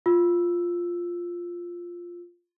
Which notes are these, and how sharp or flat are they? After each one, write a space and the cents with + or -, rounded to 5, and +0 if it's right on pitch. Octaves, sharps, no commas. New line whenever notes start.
F4 +0 E6 +0